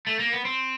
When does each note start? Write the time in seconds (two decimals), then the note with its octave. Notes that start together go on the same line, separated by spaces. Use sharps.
0.07 A3
0.19 A#3
0.32 B3
0.45 C4